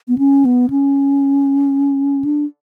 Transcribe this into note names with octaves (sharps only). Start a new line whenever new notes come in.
B3
C#4
B3
C#4
D4